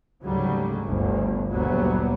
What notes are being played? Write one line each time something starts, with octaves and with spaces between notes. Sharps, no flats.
D2 G#2 C#3 F#3 G3
G1 D2 G2
F#1 D2 A#2 F#3 G3 B3